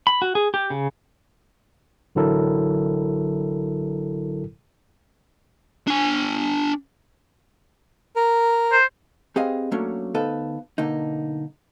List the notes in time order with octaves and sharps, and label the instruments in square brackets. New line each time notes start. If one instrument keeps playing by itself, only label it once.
[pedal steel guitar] B5
F#4
G#4
G4
C#3
[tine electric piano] A1 D3 F#3 E4 A4 A#4
[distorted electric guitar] D4 G#5
[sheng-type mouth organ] A#4
[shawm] C5
[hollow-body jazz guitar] C4 G4 G#4 B4 D#5 F5
F#3 A3 A#3 C#4 D4
D2 B3 D#4 A4 B4 F5
B1 D3 A#3 D#4